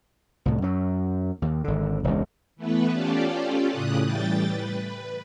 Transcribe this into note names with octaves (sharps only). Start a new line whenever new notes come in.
C2 A2
F#2 F#3
D#2
G#1 D3
E1 C#2
E3 A3 B3 B4
C#4 F4 G4 A4 D5
A2 C#3 D#6 F#6
A2 E3 G3 G5 A6
B4